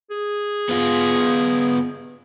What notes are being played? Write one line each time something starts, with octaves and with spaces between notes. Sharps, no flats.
G#4
B3 F4